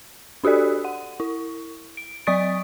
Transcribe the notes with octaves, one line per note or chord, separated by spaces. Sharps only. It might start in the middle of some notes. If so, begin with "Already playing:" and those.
D4 F#4 G4 A4 D5
F#5
E4
D7
F#3 D5 C#6 D#6 A6 D7